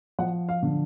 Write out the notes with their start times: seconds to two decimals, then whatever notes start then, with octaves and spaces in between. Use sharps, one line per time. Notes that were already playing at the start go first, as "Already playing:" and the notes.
0.19 F3 F#5
0.49 F5
0.63 D3